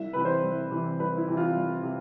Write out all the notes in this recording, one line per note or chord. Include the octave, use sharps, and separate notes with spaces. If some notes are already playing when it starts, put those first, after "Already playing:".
Already playing: C2 E5
C3 E3 B4
C5
C2
C3 E3
C2 B4
E4
C3 E3
F4
C2
C3